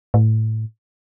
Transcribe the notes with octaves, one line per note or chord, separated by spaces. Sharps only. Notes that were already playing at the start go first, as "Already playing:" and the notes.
A2